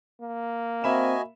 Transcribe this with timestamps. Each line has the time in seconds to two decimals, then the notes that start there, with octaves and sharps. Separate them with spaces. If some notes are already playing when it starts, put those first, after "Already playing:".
0.21 A#3
0.84 C4 F#4 D#5 E5 G#5 B5 E7